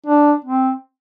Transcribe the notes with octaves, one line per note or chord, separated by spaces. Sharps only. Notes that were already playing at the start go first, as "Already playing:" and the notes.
D4
C4